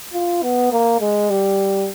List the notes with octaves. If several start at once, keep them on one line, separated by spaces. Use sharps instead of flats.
F4
B3
A#3
G#3
G3